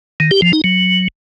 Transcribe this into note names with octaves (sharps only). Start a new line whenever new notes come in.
D#3
G4
F3
D#4
F#3